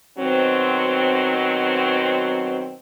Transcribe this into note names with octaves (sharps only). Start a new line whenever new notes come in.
B2 D#3 F#3 C4